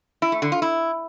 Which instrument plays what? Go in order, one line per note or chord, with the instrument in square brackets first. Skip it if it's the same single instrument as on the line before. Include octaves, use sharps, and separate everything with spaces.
[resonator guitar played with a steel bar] E4
A3
D3
F4
E4